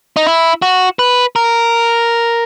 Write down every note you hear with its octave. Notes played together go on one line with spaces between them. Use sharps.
D#4
E4
F#4
B4
A#4